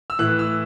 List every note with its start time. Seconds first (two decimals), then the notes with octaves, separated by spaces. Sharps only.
0.10 E6
0.19 A2 E3 F#6
0.39 E6